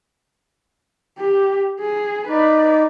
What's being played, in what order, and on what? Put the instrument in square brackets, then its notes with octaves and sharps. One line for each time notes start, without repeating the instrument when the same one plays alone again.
[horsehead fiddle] G4
G#4
[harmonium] D#4 [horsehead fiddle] B4 D5